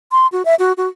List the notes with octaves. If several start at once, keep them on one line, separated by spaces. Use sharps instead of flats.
C6
F#4
E5
F#4
F#4